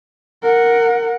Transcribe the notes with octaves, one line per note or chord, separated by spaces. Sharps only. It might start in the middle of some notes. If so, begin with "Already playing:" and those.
A#4 F#5